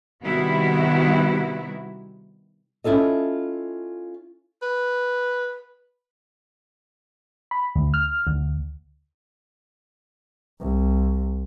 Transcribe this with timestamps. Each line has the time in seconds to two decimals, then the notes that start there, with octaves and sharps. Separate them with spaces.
0.24 C3 D#3 G3 B3 E4 F#4
2.84 C#4 E4 F4 A4 D#5
4.62 B4
7.51 B5
7.75 D2
7.94 F6
8.27 D2
10.61 C2